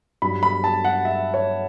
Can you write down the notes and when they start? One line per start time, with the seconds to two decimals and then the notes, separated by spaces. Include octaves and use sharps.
0.22 G2 F#3 B5
0.43 B5
0.64 A5
0.85 F#5
1.05 E5
1.34 C#5